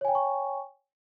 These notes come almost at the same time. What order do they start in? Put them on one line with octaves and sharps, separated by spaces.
C#5 G#5 G5 A#5 C#6